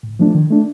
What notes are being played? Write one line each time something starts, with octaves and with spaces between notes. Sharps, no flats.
A2
F3 A3 D4
D#3
A3 D4